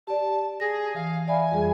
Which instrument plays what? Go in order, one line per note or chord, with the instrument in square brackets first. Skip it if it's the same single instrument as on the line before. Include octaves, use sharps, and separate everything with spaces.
[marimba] G4 D5 [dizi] A5
[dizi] G#4 [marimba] A#6
[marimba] E3 [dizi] F5
[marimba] D5 E5 B5 [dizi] G#5
[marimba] F2 G3 G#4